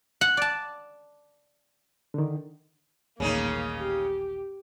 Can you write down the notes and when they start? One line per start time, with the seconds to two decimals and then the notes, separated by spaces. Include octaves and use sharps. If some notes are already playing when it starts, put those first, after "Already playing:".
0.21 F#5
0.37 D5 A5
2.14 D3 D#3
3.20 D#1 A1 C#3 A#3 C#4 D#4
3.75 G4